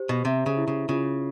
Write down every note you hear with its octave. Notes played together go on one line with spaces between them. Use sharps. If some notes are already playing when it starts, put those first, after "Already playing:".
Already playing: G4 C5
B2
C3 E5
C#3
E4
C#3
C#3 F4